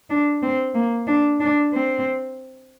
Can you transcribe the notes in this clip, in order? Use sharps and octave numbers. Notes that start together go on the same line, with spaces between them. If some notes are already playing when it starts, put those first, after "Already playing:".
D4
C4
A#3
D4
D4
C4